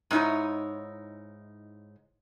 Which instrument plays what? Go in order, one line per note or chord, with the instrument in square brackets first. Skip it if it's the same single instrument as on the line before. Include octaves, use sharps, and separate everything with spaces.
[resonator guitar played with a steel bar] G#2 C#4 D#4 E4 C#5